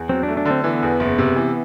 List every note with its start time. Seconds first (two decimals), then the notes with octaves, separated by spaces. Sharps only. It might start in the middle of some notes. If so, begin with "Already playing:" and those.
Already playing: E2
0.09 F#3 C4
0.23 D4
0.28 A3
0.37 D4
0.46 D3
0.51 C4
0.64 E3 B3
0.83 E2
1.00 F#1
1.18 C3
1.36 E3